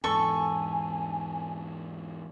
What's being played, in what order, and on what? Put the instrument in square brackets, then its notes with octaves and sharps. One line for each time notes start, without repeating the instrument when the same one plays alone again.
[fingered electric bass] E2 G#2 [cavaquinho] A4 C#6 [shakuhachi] G#5